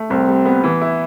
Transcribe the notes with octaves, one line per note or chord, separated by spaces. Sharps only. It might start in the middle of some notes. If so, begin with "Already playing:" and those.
Already playing: A3
C2 C4
G3
B3
E3
E4